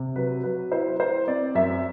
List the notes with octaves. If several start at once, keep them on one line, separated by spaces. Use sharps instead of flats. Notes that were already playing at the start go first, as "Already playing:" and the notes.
Already playing: C3
F#3 B4
F#3 B4
E4 C5
E4 C5
C4 D5
F#2 E5